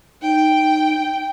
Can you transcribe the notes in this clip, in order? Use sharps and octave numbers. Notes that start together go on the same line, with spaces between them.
D#4 G5